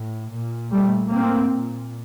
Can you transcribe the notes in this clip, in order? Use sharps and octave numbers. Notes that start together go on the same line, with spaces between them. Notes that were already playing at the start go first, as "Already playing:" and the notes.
Already playing: A2
A#2
A#2 G3 A3
A2 A#3 C4
A#2